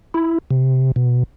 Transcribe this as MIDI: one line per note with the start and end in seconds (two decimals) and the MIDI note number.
0.14 0.38 64
0.51 0.92 48
0.96 1.23 47